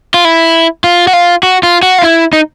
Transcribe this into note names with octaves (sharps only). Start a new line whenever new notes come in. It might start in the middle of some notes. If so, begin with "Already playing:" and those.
F4
E4
F4
F#4
F4
F#4
F4
F#4
F4
E4
D#4